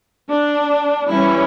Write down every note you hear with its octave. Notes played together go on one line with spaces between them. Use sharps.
D4
E3 G3 C#4 E4